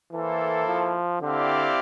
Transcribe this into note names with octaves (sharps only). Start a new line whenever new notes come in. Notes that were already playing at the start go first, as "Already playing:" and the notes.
E3 A#3 E4 A4 C5
F3
D3 C4 E4 G4 D5 F5